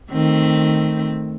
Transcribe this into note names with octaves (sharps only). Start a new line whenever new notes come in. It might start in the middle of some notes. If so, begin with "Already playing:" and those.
D#3 A3 C4